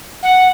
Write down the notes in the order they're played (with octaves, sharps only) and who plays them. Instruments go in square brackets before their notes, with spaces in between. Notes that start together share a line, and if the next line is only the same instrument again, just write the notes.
[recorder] F#5